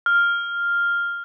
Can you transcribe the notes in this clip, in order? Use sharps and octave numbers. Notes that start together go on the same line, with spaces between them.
F6